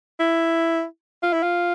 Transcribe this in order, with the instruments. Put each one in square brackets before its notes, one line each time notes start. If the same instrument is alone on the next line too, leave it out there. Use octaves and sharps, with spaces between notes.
[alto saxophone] E4
F4
E4
F4